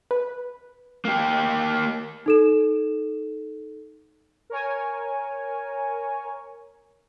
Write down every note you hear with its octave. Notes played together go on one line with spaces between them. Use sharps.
B4
A#3 G4
D#4 A4 E7
A#4 C#5 G#5